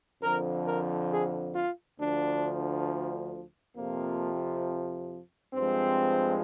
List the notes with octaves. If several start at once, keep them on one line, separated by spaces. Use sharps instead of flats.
F2 D3 F3 A#4
A#4
G#4
F4
D2 D3 F3 D4
F2 C3 F3 A#3
G2 F3 G#3 C4